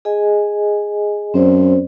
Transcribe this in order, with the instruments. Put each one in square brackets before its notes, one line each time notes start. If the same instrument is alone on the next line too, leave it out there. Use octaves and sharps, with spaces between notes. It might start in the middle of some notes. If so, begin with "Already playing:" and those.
[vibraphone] G#4 D#5 G#5
[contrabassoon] F#2 [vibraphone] C4 C5 D5